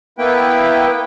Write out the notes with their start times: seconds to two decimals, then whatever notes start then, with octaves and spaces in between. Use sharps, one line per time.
0.18 A#3 B3 E4 B4 G5